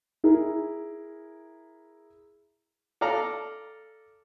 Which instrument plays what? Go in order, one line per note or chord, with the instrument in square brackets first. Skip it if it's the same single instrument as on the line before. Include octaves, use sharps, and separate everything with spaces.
[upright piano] E4 G#4 A#4
[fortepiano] A4 D5 F5 A#5